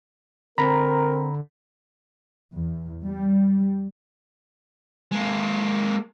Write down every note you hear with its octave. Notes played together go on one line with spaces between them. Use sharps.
D3 C4 A#4 A#5 B5
E2
G3
G#3 A#3